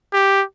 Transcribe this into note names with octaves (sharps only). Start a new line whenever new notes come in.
G4